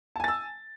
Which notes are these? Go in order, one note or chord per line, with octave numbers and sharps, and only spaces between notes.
G#5 A5 E6 A6